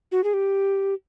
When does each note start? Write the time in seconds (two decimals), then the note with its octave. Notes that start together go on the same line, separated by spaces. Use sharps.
0.12 F#4
0.24 G#4
0.34 G4